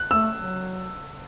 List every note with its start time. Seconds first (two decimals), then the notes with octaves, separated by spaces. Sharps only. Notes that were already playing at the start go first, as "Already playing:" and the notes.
Already playing: F#6
0.10 A3 E6
0.37 F#3